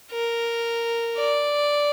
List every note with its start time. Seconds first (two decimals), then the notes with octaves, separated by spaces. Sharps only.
0.12 A#4
1.18 D5